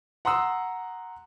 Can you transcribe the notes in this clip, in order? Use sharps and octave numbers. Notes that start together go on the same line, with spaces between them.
F#5 A#5 C6 D#6 E6